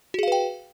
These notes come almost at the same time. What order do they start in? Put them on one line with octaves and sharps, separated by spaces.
F#4 G#4 F5 B4 G5